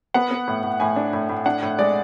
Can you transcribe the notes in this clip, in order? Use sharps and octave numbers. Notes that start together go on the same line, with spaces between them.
B3 F#5
B3
A2
A2
A2 G#5
D4
A2
A2
D4 F#5
A2
G#3 D5